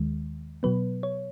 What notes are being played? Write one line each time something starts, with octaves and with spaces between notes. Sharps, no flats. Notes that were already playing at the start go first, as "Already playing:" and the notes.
Already playing: D#2 D#3 G#3
B2 F#3 B3 B4
C#5